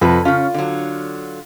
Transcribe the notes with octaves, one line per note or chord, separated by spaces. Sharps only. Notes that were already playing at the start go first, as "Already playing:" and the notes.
F2 C3 A4 B4
C#3 C#4 F4
D3 F#3